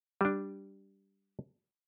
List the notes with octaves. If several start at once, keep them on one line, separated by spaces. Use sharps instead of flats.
G3 D4